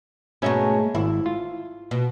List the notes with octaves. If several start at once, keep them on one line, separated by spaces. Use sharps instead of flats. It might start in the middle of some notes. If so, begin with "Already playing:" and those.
G#2 B2 G#3 A3 C#4 E5
G#1 E4
F4
B2